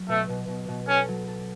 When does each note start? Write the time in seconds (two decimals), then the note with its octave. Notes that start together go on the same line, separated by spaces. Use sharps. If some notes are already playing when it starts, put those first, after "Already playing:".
Already playing: F#3
0.08 B2 A3
0.29 B2
0.48 B2
0.68 B2
0.87 C#4 A4
1.08 F#3
1.27 A4